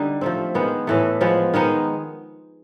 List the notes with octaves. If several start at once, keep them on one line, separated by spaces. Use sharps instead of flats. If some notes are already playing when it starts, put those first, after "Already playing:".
Already playing: D3 G3 D#4
F3 A3 C4
D#3 G#3 B3
A2 E3 A3
F3 G#3 B3
D#3 G#3 B3 D#4